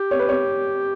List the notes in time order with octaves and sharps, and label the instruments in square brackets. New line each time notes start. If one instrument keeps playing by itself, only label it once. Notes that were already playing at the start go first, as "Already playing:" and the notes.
Already playing: [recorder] G4
[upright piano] C#5
B4
C#5